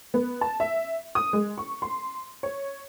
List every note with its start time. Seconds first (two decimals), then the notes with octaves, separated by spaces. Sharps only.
0.14 B3
0.41 A5
0.60 E5
1.15 D#6
1.33 G#3
1.58 C#6
1.82 C6
2.43 C#5